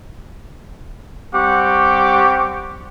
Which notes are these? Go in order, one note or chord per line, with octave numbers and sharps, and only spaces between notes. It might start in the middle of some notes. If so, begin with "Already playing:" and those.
G3 C4 G4 F#5 C#6 D6